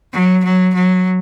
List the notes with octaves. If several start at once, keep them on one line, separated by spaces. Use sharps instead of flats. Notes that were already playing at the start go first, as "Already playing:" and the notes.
F#3
F#3
F#3